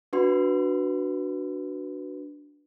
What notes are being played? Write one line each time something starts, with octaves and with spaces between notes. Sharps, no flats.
D4 F#4 B4 C6